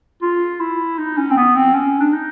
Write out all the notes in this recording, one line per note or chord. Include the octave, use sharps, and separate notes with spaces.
F4
E4
D#4
C#4
C4
B3
C4
C#4
D4
D#4